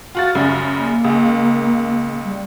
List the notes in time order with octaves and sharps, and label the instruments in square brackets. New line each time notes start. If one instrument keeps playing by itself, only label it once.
[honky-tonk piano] F4 F#4 A6
F#2 C#3 G3
[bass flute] A#3
[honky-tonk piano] C#2
[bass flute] G3